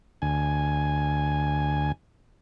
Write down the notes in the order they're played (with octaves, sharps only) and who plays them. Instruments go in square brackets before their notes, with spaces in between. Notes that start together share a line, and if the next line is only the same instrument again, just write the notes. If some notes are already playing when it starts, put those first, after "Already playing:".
[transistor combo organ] D2 G#5